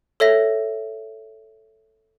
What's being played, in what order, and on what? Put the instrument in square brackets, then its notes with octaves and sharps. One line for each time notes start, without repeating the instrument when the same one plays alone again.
[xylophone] A4 C#5 E5 A#6